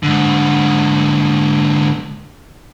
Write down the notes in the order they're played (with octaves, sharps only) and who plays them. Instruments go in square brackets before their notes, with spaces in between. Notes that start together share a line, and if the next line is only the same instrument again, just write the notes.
[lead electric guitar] G#2 D3